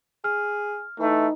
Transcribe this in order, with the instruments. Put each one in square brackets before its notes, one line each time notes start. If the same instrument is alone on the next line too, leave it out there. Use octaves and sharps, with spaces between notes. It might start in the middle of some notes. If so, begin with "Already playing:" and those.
[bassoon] G#4 [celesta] F6
[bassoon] E3 [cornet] A3 [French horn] D#4